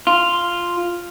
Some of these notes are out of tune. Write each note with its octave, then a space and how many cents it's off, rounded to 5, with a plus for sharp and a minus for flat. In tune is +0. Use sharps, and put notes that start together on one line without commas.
F4 -5